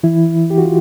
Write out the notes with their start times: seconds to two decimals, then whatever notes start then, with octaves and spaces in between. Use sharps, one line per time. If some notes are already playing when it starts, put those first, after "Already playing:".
0.03 E3 E4
0.50 G4
0.58 F#4
0.65 F4